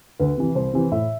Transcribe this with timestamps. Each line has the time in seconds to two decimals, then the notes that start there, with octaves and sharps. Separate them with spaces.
0.19 D2 B4
0.38 C3 E3
0.55 C2 C5
0.73 C3 E3
0.91 A2 E5